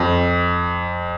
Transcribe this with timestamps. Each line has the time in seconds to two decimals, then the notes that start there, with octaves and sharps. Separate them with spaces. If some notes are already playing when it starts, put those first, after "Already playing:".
Already playing: F2